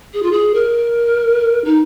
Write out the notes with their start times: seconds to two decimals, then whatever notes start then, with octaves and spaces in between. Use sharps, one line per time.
0.14 G#4
0.23 F4
0.32 G#4
0.54 A#4
1.65 D#4